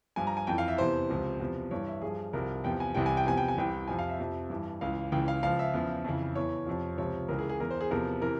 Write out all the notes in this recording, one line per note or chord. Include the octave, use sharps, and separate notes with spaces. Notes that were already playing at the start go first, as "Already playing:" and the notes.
G2 F3 G#5
A#5
G#5
F2 E3 G5
F5
E5
E2 C3 E3 C5
C#2 C3 F3
E2 C3 F3
G2 E3 C#5
E5
G2 F3 G#4
C2 C3 F3 A#4
E2 C3 F3 G5
G#5
C2 C3 E3 G5
G#5
G5
E2 C3 F3 G#5
G5
G#5
C2 C3 E3 G5
F2 C3 F3 G#5
F5
E5
F2 C3 F3
G2 E3
C#2 C#3 E3 F5
C#2 C#3 E3 G5
F5
C#2 C#3 F3 F5
E5
E2 C#3 F3
F2 C#3 E3
E2 E3 C#5
F2 C3 F3
C#2 C3 F3 C#5
C#2 C#3 E3 A#4
G#4
G#4
E2 E3 A#4
C5
G#4
E2 C3 F3 A#4
C3 E3 A#4